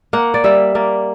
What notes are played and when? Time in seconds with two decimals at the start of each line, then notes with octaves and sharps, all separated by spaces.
0.13 A#3 F#5
0.34 D5
0.44 G3 E5
0.75 A#3 D5